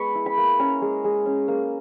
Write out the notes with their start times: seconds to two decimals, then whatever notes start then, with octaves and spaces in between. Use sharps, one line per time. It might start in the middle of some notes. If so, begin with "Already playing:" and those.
Already playing: G#3 B3 B5 C#6
0.15 E4
0.26 B5
0.38 A#3
0.59 C#4 A#5
0.82 G#3
1.04 G#3
1.26 C#4
1.48 A#3